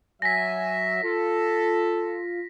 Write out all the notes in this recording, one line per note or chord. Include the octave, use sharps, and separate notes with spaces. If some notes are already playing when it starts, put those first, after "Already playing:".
F#3 E5 G#5 A#6 B6
F4 A4